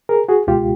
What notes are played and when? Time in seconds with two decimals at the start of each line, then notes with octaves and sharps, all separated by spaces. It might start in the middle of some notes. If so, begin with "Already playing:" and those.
0.09 G#4 A#4
0.29 F#4 G#4
0.47 C#2 B2 G#3 F4 G4